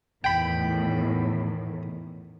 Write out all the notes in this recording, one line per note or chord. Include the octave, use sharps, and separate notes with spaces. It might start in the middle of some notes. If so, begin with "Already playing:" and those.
E2 A2 D#3 G5 B5